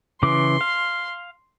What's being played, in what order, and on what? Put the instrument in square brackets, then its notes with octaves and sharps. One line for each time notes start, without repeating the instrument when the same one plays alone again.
[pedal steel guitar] C#3 E3 D6 [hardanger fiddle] C6
[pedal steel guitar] F5